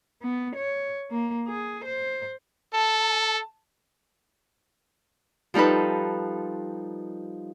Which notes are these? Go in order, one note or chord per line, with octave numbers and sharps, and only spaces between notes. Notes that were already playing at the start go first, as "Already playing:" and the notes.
B3
C#5
A#3
G#4
C5
A4 A5
F3 G3 D#4 A4 B4